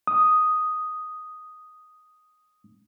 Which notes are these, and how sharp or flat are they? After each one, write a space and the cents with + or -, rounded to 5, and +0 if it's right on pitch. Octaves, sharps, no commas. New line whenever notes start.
D#6 +0